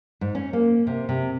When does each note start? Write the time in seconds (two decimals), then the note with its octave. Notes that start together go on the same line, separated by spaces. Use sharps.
0.21 G#2
0.35 C#4
0.53 A#3
0.87 C3
1.09 C3